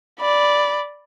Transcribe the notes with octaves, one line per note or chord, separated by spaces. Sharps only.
D5 B5